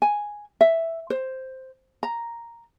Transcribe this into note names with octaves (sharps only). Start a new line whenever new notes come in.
G#5
E5
C5
A#5